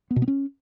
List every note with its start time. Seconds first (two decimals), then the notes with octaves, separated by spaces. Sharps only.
0.11 B3
0.16 B2
0.22 B3
0.28 C#4